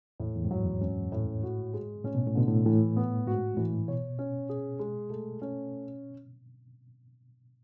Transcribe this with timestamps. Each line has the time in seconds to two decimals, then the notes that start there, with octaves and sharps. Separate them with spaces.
0.20 E2 A2
0.35 E2
0.45 G#2
0.51 F#2 F#3
0.66 E2
0.81 G#2 C#4
1.12 A2
1.43 F#4
1.74 G#3
2.04 A2 C#4
2.15 B2
2.27 A2
2.35 B2 D3
2.48 A2
2.66 A2 E3
2.97 B3
3.26 G#2 F#4
3.57 A2 E3
3.88 B2 C#5
4.19 C#4
4.49 G#4
4.79 G#3
5.10 A3
5.42 C#4